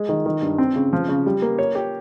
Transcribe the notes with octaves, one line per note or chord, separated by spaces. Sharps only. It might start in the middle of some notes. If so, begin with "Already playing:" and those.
Already playing: G#3
D#3
D#3
G2
C4
C#3
F3
C#3
G3
A#3
C#5
G4